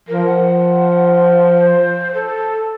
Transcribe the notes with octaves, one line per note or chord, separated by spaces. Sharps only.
F3 A#4
F#5
C5
A4